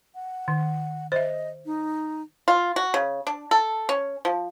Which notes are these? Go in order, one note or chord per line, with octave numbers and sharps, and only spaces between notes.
F#5
D#3
C5 D#5 E5
D#4
F4
F#4
C#3
D4
A4
C#4
F3